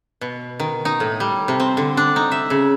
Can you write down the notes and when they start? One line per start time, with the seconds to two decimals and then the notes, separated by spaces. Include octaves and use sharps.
0.21 B2
0.60 D#3
0.85 D#4
1.00 A2
1.20 G3
1.48 C3
1.60 C4
1.77 D3
1.97 D4
2.16 D#4
2.31 E5
2.50 C#3